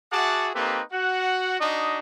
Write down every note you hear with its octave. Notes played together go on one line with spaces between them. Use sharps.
F#4 G#4 E5 F#5 A5 D6
A#3 C4 D#4 G4 A4 B4
F#4 F#5
D4 D#4 F#4 D#5